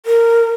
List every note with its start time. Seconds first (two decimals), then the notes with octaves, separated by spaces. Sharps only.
0.06 A#4